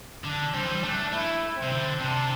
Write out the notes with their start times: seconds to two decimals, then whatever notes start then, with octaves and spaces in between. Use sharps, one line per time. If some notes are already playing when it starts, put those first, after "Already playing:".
0.24 D3 D4
0.54 G3 C4
0.62 E3
0.71 G3
0.83 A3 D4
1.12 A3 E4
1.56 C4
1.63 C3
1.71 D3
2.00 C3 D4